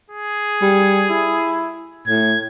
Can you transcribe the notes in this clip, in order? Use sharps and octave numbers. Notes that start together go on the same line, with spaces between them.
G#4
G3
E4
A2 G#6